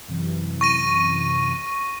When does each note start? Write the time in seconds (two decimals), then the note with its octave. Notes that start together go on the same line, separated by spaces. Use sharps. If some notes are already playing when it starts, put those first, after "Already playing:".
0.08 F#2 C3 E3
0.61 C#6 A#6 D#7